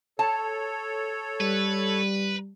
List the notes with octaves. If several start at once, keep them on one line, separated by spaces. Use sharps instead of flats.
A4 C#5 A5
G3 B4